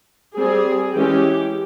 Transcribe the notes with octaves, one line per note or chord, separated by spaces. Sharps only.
G3 C4 G#4
E3 G#3 C#4 G4